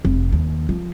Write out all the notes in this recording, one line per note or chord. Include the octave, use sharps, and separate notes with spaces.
F1
D#2
F3